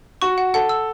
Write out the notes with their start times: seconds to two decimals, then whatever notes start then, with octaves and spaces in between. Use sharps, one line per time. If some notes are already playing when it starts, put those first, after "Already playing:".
0.22 F#4 C#6
0.38 F#5
0.54 A4 F#5
0.69 E6